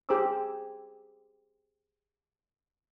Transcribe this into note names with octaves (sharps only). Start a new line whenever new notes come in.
G4 G#4 C5 A#5 D6 E6